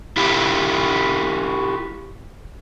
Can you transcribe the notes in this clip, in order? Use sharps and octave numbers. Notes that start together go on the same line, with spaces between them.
E4 F4 G4